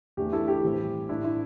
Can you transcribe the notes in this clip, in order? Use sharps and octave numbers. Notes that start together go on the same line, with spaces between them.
E2 E3 A3 D4 G4
E4 A4
G4
A2 E3 G3 C4
A2 A3 D4 E4
E4